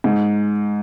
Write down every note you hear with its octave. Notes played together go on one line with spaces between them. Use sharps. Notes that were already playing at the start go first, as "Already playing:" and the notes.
G#2